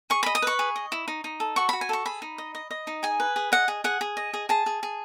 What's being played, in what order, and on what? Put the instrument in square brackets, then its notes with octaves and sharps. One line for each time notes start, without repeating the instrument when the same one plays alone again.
[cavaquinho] G#4 C#6
D#5 B5
D#6
B4 C#6
G#4
D#5
E4
D#4
D#4
A4
F#4 C#6
F#4 B5
G#5
A4 C#6
G#4 B5
D#4
D#5
D#5
D#5
D#4
G#4 G#5
B4
G#4
D#5 F#5
G#4
G#4 F#5
G#4
D#5
G#4
G#4 A5
G#4
G#4